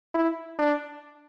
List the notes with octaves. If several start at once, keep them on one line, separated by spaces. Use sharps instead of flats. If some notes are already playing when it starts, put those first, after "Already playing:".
E4
D4